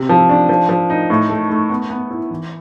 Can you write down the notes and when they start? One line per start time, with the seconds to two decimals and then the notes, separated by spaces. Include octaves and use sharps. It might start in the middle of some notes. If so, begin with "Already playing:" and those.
Already playing: C3
0.09 F3
0.29 D4
0.49 F3
0.69 F3
0.90 D#4
1.10 A2
1.29 A3
1.50 A3
1.70 B3
1.90 B3
2.10 E4
2.31 E3